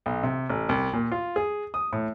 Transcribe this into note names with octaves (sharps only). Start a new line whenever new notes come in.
B1
C3
A1
C2
A#2
F4
G#4
D#6
A2